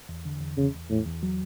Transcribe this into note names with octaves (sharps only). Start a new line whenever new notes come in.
E2
D3
E2
E2 C#3
E2
E2 A2
E2
F#3